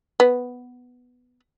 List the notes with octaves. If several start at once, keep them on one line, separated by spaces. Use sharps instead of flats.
B3